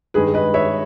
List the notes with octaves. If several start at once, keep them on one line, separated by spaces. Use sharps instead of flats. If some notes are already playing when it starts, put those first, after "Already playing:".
G2 D#3 G#3 G#4 B4
B4 D#5
C#5 E5